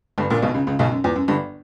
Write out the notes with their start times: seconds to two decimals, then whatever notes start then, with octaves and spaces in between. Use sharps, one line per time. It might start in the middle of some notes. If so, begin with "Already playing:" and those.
0.18 G1 G2
0.30 A#1 A#2
0.42 B1 B2
0.54 C#2 C#3
0.67 C#2 C#3
0.79 B1 B2
0.92 F#2
1.04 E2
1.16 F#2
1.28 G1 G2